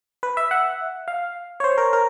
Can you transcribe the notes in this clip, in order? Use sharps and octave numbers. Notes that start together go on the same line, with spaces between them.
B4
E5
F#5
F5
C#5
C5
A#4
A#4